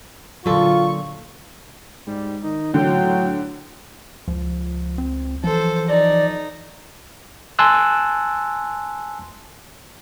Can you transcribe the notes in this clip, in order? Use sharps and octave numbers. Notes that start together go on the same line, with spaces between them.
A#2 D3 F#3 F4 A4 C#6
G#2 G3
D#3 D#4
A2 D3 F#3 G5
C#2 F3
C4
E3 F3 A4 C5
D#4 D5
G#5 A5 C6 E6 F#6